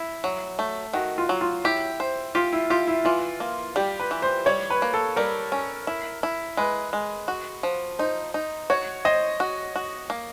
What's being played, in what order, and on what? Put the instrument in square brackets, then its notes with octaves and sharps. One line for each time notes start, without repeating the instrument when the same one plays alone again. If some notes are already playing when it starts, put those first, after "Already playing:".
Already playing: [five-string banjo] E4
F#3
A3
[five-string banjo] D#3 [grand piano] F#4
[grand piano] F4
[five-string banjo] F#3
[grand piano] F4
[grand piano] E4 [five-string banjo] G4
[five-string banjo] C5
[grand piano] F4 [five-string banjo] G4
[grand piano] E4
[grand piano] F4 [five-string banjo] G4
[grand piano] E4
[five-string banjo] E3 [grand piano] F4
[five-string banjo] A#3
[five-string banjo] G3 [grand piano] G4
[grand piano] B4
[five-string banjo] E3
[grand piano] C5
[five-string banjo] G3 [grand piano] C#5
[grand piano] B4
[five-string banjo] A#3
[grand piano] A4
[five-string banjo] G3 [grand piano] A#4
[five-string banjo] C#4
E4
E4
[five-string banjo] G#3 [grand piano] B4
[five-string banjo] G#3
F#4
F3
[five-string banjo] D#4 [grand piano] C5
[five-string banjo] D#4
[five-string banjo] F#4 [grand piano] C#5
[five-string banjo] C5 [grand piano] D#5
[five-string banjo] F#4
F#4
A#3